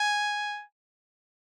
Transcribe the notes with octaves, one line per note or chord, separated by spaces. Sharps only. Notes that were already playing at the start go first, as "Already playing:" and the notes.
Already playing: G#5